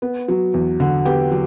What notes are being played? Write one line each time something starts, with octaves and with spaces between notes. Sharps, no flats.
B3
F#3
E2
D3
B3 G4 G5
F#3